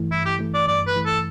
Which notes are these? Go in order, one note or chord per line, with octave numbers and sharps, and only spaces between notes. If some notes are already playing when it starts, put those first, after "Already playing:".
Already playing: G2 E3 A3
G2 E4
G4
E3 A3
D5
G2 D5
B4
E3 A3
A4